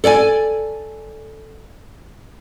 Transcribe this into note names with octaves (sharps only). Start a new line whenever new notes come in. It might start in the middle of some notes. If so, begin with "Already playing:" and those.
A4 D5 G5 G#5